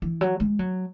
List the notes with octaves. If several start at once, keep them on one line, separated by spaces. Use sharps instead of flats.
E3
F#3
G#3
F#3